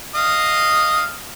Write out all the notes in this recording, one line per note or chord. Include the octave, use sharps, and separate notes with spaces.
D#5 F5 D#6